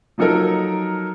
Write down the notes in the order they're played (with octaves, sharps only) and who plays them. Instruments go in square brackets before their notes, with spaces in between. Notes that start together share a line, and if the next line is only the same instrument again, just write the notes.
[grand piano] F3 F#3 D#4 A4 A#4